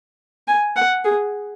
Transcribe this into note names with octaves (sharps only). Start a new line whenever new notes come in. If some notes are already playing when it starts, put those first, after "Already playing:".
G#5
F#5
G#4